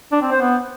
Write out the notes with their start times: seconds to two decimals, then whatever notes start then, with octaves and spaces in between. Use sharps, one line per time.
0.12 D4
0.22 C4
0.31 C5
0.41 B3